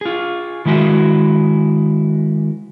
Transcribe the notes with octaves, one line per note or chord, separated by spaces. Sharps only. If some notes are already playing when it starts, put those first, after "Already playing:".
F4 G#4
D#3 G#3 E4 F#4